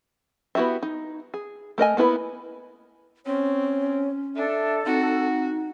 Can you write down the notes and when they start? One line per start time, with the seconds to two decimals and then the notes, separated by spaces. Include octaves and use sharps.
0.55 B3 E4 F#4 G4 E5
0.83 D#4
1.34 G#4
1.78 A3 A#4 D#5 G#5
1.97 A#3 B3 E4 A4 B4
3.26 C4 C#4 C#5
4.36 D4 A4 E5
4.86 C4 D#4 F#4